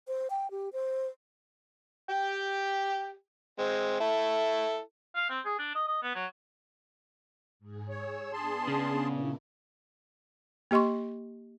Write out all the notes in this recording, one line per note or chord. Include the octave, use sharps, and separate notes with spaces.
C5
G5
G4
C5
G4 G5
G#3 C4
E4 A4
F5
C4
G#4
D4
D#5
D#5
B3
F#3
G#2 G#4
G#4 C#5 E6
B3 D4 G#4 A5 C6
C#3
A#2 A#3 E4
A#3 G4 D#5 C6 C#6